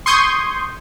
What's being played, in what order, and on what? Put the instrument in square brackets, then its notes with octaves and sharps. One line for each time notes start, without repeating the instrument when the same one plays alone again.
[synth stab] C6 C#6 D#6 G6 G#6